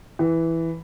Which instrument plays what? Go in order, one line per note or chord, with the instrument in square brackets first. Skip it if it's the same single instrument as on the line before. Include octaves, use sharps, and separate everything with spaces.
[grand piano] E3